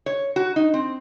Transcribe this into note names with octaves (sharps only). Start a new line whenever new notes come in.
C#5
F#4
D#4
C4